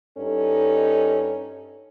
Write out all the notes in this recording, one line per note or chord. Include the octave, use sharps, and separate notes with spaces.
G2 C#4 D#4 A4